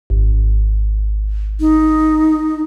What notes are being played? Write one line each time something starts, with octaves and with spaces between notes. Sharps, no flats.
G#1
D#4